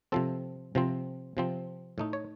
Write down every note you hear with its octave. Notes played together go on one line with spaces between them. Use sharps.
C3 F3 C4 A4
C3 F3 C4
C3 F3 C4
A2 A3 D#4
C#5